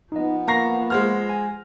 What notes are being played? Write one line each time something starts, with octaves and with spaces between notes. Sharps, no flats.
F3 B3 D#4 D#5
A#3 A#5 C#6 A#6 C7
G#3 C5 F6
G#5